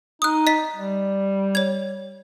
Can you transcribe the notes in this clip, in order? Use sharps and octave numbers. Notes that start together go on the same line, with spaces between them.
D#4 D#6 F#6
D#5 B6
G3
C#5 G#6